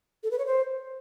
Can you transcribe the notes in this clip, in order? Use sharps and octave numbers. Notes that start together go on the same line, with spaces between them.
A4
B4
C#5
C5